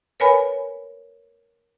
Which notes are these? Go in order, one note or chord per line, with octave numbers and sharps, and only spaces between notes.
A#4 B4 C#5 G#5 B5